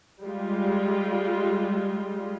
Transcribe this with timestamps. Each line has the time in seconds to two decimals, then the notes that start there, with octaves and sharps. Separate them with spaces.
0.22 G3 G#3 F4